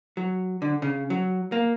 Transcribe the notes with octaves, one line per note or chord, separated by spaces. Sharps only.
F#3
D3
C#3
F#3
A#3